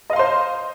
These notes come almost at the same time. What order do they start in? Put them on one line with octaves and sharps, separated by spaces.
D#5 F5 C6 C5